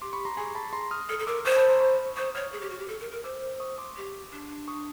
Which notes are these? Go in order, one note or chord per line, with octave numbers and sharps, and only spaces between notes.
G4 C6 D6
B5 C#6
A#5 C6
G#4 G#5 A#5
A5 B5
A#5 C6
D#6 F6
A4 D#6 F6
A4
A#4 D6 E6
C5 C#6 D#6
A5 B5
A#5 C6
B5 C#6
C5 C#6 D#6
C#5 D#6 F6
G#4
G4
F#4
G4
A4
A#4
A#4
C5 D6 E6
C#6 D#6
C6 D6
G4
D4
C#6 D#6